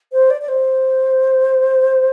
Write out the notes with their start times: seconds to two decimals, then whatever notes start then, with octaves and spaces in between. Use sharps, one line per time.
0.12 C5
0.30 D5
0.42 D5
0.48 C5